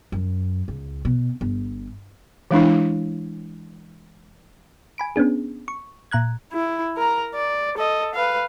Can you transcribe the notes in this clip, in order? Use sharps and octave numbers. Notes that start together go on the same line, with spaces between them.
F#2
C#2
B2
G1
E3 G#3 D4 E4
G#5 B5 D7
B3 C#4 D4 G#4
C#6
A#2 A#5 F#6 G#6
E4
A#4 A#5
D5
A4 D#5
B4 F5